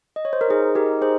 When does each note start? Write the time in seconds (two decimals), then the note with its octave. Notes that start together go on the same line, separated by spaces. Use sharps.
0.16 D#5
0.25 C#5
0.33 C5
0.41 A#4
0.50 D#4 G#4
0.75 G4 A#4
1.02 G#4 C5